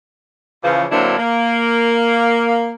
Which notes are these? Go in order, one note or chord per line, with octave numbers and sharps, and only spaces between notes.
C#3 E3 F3
D3 F#3 A#3 C4 D4 E4
A#3